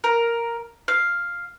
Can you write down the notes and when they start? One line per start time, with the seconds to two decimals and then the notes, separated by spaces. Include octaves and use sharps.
0.04 A#4
0.88 F5